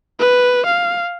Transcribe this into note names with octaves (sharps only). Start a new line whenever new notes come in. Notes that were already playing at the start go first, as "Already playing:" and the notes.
B4
F5